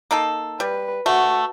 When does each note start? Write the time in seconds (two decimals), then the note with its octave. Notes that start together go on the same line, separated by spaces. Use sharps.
0.11 A#3 D#4 A4
0.60 G3 B4
1.06 A3 F#4